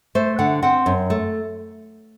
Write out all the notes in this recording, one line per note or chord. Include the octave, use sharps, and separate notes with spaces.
A3 C5
D3 F#5
C4 F#5
F#2
A3